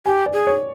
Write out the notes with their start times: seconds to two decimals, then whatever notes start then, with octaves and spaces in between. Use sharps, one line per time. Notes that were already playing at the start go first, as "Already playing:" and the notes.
0.06 G4 G#5
0.26 D5
0.33 G#4
0.47 C#5